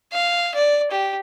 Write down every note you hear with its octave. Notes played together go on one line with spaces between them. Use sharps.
F5
D5
G4